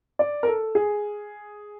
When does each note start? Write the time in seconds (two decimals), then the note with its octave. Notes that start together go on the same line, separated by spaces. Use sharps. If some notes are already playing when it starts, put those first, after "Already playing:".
0.19 D5
0.43 A#4
0.47 A4
0.75 G#4